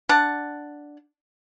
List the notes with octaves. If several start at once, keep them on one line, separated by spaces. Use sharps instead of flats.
D4 F#5 A5